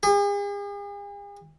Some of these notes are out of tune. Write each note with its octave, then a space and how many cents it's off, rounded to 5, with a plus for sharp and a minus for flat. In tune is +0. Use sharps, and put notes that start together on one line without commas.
G#4 -45